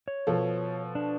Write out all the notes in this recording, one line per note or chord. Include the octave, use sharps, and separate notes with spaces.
C#5
B2 F3 A4
D4